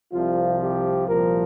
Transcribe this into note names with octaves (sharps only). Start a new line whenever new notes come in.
C2 C3 F3 F4
G4
C2 A#2 F3 A#4